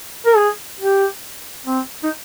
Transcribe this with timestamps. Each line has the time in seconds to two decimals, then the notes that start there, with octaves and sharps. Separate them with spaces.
0.26 A#4
0.36 G#4
0.79 G4
1.66 C4
2.04 D#4